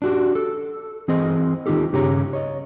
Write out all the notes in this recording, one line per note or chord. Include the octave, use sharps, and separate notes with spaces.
D4 F#4 G4
A4
E3 C4 G#4 C5 D#5
D#3 D#4 F4 G4 A4
G2 C#3 G4 G#4 C#5 A#5
C#5 D#5